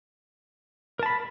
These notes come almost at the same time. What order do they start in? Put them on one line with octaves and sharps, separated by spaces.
A#4 A5 B5